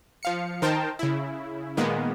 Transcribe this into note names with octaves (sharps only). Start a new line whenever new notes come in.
F3 F5 C#7
D#3 D#4 A#4 C5 G5 A5
C#3 E4
A#2 D#3 G#3 A#3 B3